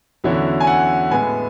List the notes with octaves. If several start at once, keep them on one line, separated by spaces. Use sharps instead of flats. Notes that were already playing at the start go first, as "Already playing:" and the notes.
E2 D3 F#3 C#4 E4
G#5
F#5
A2 G#3 B3 G#5